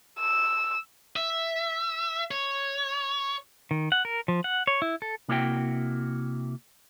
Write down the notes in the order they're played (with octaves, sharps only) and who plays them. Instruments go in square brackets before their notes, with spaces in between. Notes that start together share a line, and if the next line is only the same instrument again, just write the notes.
[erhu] E6
[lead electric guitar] E5
C#5
[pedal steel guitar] D#3
F#5
A#4
F3
F#5
C#5
E4
A4
[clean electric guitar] C3 A#3 E4 F#4 E5 G5